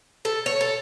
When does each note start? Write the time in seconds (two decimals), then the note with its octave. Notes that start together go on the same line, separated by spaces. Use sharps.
0.25 A4
0.46 C#5
0.61 A4